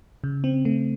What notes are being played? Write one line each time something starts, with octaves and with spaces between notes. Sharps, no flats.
C#3
C4
A3